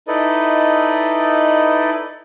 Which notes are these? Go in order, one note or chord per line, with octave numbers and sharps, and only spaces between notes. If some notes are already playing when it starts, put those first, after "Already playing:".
D#4 E4 A4 B4 D5 D#5